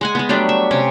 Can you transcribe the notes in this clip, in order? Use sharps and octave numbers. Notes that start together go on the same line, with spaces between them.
G#3 F#5 G#5
G#3 B3
F#3 G3 A3 D4
E5
C3 C#4